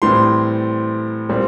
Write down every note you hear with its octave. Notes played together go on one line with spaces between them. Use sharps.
A2 E3 G3 C4 C6
A#2 G3 C4